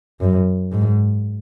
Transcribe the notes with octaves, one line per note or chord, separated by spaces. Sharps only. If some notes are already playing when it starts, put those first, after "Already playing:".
F#2
G#2